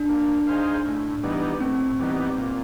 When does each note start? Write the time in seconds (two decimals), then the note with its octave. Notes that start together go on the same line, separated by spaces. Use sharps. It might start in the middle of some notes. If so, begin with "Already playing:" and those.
Already playing: D4
0.09 A#3
0.47 D#4 G#4 C5 F5
0.85 A2
1.23 E3 G3 B3 D#4
1.61 A2 C4
1.99 E3 G3 B3 D#4
2.37 A#2